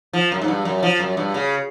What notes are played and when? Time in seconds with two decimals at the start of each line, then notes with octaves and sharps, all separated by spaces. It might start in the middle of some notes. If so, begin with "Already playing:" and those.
0.13 F3
0.32 F#2
0.42 G#2
0.48 G2
0.65 F#2
0.83 F3
1.00 F#2
1.17 G2
1.34 C#3